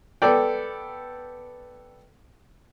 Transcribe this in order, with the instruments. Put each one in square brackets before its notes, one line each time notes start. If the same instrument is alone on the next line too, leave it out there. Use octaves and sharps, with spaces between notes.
[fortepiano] B3 A4 D5 G5